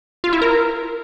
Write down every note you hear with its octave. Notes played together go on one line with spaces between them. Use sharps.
F4
E4
A#4